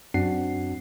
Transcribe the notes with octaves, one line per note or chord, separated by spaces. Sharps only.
F#2 C4 D4 F#4 F#5 C7